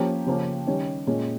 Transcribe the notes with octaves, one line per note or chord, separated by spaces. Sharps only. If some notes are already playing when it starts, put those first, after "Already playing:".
Already playing: F3 A#3 C#4 G4
C#3 F3 A#3 C#4
D#3 G3 C#4
A#2 G#3 C#4